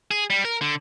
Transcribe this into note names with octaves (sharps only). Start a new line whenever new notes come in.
G#4
G3
A#4
D3